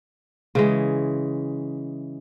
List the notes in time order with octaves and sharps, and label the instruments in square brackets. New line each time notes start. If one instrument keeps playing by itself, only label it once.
[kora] C#3 E3 G#3